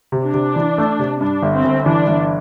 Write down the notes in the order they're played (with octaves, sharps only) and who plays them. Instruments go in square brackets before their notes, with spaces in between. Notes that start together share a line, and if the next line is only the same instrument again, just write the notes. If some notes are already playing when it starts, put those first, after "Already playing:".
[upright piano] C3
[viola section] D4
[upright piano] C3
E3
A3
C3
[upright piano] G2 [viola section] D4
[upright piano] G1
[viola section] C4
[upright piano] G1
[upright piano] E3 [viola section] D4
[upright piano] G1